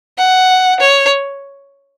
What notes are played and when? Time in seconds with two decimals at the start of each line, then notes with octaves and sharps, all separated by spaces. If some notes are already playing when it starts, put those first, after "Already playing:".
0.18 F#5
0.80 C#5